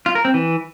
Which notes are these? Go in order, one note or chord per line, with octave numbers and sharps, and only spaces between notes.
F4
A#4
C4
E3